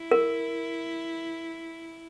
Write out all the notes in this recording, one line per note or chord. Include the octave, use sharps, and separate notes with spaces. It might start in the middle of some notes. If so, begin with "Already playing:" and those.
Already playing: E4
A#4